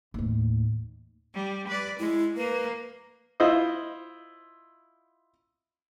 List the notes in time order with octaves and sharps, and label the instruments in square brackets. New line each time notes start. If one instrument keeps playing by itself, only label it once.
[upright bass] D#2 A2
[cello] G3
B4 D5
[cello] G#3 [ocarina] E4
[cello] A#3 [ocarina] B4
[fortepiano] E4 F4 C5 D#5